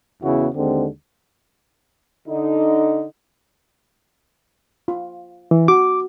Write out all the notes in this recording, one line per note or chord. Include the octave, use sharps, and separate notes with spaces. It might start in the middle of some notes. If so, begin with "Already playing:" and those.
E2 C#3 B3 E4 F#4
D#2 D3 G#3 C4
D3 D#4
F4
E3
F#4 D6